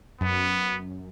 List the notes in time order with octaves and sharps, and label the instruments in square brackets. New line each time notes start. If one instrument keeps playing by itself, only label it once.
[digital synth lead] F#2 [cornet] B3